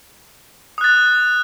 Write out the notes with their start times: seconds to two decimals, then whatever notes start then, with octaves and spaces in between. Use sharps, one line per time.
0.78 D#6
0.81 F#6
0.84 A6